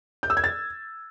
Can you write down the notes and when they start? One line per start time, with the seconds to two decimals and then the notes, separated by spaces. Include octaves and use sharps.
0.23 G6
0.30 E6
0.37 G#6
0.44 A6